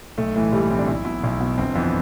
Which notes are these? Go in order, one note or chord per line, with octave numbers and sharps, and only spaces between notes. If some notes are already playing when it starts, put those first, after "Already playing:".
B1 A3
A2 E3 A3
B1 G3
A3
A2 E3 C4
D4
B1 E4
B2 E4
B1
B2
G1 C4
F2 E3 B3